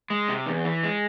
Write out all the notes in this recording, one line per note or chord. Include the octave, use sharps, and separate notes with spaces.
G#3
C3
E2
E3
G#3